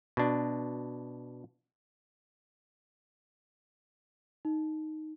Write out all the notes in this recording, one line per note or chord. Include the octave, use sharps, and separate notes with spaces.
B2 D4
D#4